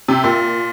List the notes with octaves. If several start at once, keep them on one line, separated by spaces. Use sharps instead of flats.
C3
A#2